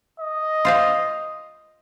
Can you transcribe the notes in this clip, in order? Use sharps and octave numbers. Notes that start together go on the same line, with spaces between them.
D#5
F4 C5 F5